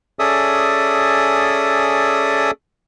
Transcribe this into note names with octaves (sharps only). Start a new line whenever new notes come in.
C#4 G#4 A4 D5 E5 D#6